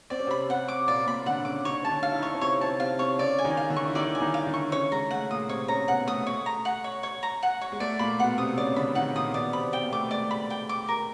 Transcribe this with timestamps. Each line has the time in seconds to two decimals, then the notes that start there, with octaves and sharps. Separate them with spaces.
0.10 C4 D5
0.20 C#4
0.27 C3 C4 B5
0.49 C3 C4 F#5
0.68 D6
0.88 A#2 A#3 D5
1.06 A#2 A#3 B5
1.26 D3 D4 F#5
1.45 C#3 C#4 D6
1.65 D#4 C#5
1.73 D4
1.82 C#4 A5
1.90 D3 D4
2.03 F5
2.12 E4
2.19 D#4
2.23 D4 C#5
2.34 C#4
2.41 C3 C4 C#5
2.61 C3 C4 A5
2.80 C3 C4 F5
2.99 C3 C4 C#5
3.19 C#3 C#4 D5
3.39 G#5
3.44 D#3 D#4
3.57 F5
3.69 D3 D4
3.76 C#6
3.88 E4
3.95 D#3 D#4 D5
4.15 G#5
4.21 D#3 D#4
4.34 F5
4.47 D3 D4
4.54 C#6
4.72 C#3 C#4 C#5
4.92 G#3 A#5
5.11 A3 F#5
5.30 A#2 A#3 D#6
5.49 C3 C4 C#5
5.68 C#3 C#4 A#5
5.88 B2 B3 F#5
6.07 A3 D#6
6.27 A3 C#5
6.46 A#5
6.65 F#5
6.84 C#5
7.03 C#5
7.23 A#5
7.43 F#5
7.61 C#5
7.72 G#3
7.80 A3 D5
7.99 A#2 A#3 B5
8.18 B2 B3 F#5
8.38 C3 C4 D#6
8.57 C#3 C#4 D5
8.76 D3 D4 B5
8.95 D#3 D#4 F#5
9.15 A#2 A#3 D#6
9.34 B2 B3 D5
9.53 C3 C4 B5
9.66 C4
9.73 B3 G5
9.83 A#3
9.93 A3 D6
10.11 G#3 D5
10.31 B5
10.50 G5
10.69 D6
10.89 A#4